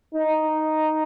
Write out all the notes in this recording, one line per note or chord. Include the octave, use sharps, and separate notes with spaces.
D#4